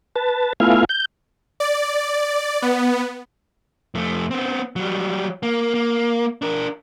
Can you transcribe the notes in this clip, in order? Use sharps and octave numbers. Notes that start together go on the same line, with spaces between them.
B4 A5
A3 B3 E4 F4 F5 G#5
G6
D5
B3
F2 A3
B3 C4
F#3 G3
A#3
A#3
D4 A#4